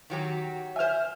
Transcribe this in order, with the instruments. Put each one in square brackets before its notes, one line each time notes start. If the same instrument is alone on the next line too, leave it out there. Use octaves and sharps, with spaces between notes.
[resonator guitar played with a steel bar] D#3 F#3 G4
[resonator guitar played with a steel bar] C5 G#5 [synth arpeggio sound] E5 F6